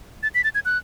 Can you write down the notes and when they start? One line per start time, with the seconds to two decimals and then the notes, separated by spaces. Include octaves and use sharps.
0.23 A6
0.35 B6
0.44 A6
0.55 G#6
0.65 F#6